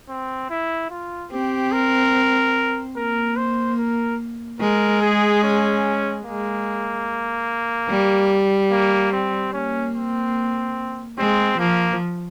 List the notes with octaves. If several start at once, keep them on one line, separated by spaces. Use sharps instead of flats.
C4
E4
F4
C4 G4
A#4
A#3 A#4
C5
A#4
G#3 A#4
G#4
C#4
G#3 A#3
G3
A#3
C4
A#3 C#4
C4
G#3 C4
F3 A#3